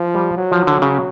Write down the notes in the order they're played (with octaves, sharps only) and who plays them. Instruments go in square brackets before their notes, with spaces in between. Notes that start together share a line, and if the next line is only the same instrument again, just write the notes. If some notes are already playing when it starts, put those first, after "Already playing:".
Already playing: [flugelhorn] F3
[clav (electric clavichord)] G3
[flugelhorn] F#3
[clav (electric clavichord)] F3
D3
C#3